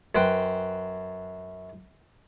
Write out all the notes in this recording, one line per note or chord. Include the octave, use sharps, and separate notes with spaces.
F#2 B4 C5 G5